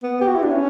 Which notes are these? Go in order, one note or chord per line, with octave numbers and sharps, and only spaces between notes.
B3
G4
F#4
E4
D4
C#4